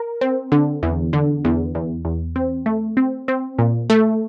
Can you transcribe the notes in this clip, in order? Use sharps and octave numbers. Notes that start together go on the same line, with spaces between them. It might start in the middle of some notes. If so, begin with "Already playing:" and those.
Already playing: A#4
C4
D3
E2
D3
E2
E2
E2
C4
A3
C4
C4
A#2
A3